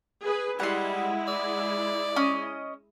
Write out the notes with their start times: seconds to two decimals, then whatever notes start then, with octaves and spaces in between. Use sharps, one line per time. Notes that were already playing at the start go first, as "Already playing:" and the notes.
0.22 G#4 B4
0.60 G3 G#3 E4 F#5 C6
1.28 D5
2.16 C#4 D#5